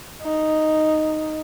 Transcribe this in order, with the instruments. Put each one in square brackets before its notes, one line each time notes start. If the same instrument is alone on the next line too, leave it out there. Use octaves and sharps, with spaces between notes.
[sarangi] D#4